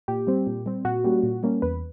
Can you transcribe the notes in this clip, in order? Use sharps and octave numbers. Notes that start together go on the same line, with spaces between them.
A#2 G4
G3 C4
A#2
G3 C4
A#2 F#4
G3 A#3 C#4
A#2
G3 A#3 C#4
E2 B4